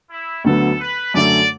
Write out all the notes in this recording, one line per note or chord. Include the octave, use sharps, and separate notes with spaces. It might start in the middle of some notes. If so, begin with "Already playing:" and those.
E4
D2 D3 F#3 B3 A4
B4
F#2 D3 A3 D5